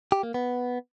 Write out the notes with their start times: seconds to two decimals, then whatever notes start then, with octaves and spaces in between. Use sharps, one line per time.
0.12 G4
0.23 A#3
0.34 B3